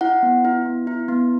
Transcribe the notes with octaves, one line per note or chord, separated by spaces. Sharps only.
E4 F#5
B3
E4
B3
E4
B3